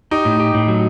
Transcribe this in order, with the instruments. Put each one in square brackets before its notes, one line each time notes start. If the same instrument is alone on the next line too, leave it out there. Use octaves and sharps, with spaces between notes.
[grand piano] D#4 [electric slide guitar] G4
[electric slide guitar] A2
G4
A2
F#3